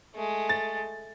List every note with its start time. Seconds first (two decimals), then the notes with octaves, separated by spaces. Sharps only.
0.15 G#3 A3
0.49 A6